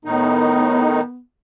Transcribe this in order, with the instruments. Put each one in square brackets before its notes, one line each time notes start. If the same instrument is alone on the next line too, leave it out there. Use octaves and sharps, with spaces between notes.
[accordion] A2 D#3 D#4 [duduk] B3